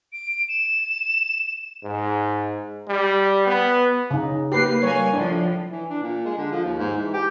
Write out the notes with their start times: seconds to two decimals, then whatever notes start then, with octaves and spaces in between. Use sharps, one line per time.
0.13 D7
0.48 E7
1.83 G#2
2.88 G3
3.47 B3
4.11 C#3 D#4
4.52 A#3 G4 B4 C7
4.83 G3 A#3 C#5 G#5
5.13 A2 F3 D4
5.71 E3
5.89 D4
6.02 A#2
6.25 G#3
6.38 D3
6.52 F3
6.64 D#2
6.78 G#2
6.97 E3
7.13 G4